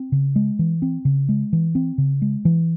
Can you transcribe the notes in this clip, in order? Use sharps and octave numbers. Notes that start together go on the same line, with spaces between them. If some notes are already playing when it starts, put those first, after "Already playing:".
Already playing: C4
C#3
G#3
E3
C4
C#3
G#3
E3
C4
C#3
G#3
E3